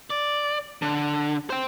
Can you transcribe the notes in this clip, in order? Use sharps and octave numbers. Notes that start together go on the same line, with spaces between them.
D5
D3
C5 G5